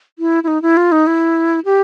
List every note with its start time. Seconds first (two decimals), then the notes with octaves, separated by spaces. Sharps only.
0.19 E4
0.43 E4
0.48 D#4
0.62 E4
0.77 F4
0.92 D#4
1.07 E4
1.65 G4